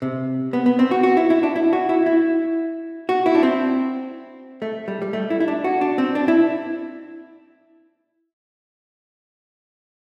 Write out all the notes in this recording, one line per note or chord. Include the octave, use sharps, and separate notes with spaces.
C3
B3
B3
C4
F#4
F#4
E4
E4
D4
E4
F#4
E4
E4
F#4
E4
D4
C4
A3
G3
G3
A3
E4
E4
D4
F#4
D4
C4
D4
E4